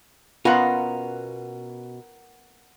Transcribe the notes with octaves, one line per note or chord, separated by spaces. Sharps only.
B2 B3 C#4 F4 A#4 F#5 A#5